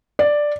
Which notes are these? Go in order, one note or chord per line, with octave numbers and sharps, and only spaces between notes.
D5